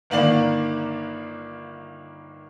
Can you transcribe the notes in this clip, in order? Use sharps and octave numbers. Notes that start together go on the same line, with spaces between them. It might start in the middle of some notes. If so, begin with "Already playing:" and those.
G1 D#3 A#3 D5 F#7